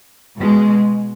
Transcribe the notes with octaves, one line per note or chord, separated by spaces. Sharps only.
B2 G#3